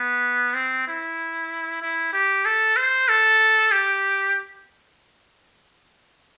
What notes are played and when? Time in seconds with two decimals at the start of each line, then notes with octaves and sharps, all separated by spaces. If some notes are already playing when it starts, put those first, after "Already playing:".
Already playing: B3
0.55 C4
0.88 E4
1.82 E4
2.13 G4
2.45 A4
2.76 C5
3.09 A4
3.72 G4